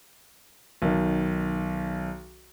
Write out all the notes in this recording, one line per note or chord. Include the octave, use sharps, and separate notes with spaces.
B1 D#3